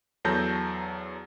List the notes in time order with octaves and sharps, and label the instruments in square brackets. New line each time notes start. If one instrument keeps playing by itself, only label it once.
[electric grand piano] E2 F#3 A4 A5 G6 A#6